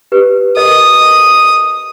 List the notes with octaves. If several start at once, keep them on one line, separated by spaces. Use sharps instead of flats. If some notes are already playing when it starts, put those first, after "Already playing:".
G4 B4
A#4 D#5 D#6